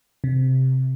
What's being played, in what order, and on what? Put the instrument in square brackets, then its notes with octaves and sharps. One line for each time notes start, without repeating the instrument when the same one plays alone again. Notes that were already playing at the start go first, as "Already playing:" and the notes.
[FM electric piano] C3